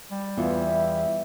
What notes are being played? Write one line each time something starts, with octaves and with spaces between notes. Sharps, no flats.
G3
E2 B3 F4 E5